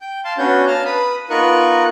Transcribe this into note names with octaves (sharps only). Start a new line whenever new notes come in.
G5 G6
F5 A5 C6
B3 C#4 D4 F#4 C#5 G6
F5 A5 A#5 F6
B4 B5 D#6
B3 D#4 F4 A#4 C#6 F#6